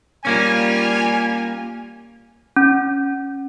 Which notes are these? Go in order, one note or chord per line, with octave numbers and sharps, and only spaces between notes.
G3 A#3 C#4 F4 G#5
C#4